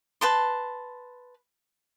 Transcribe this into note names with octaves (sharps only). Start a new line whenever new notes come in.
B4 A5 C6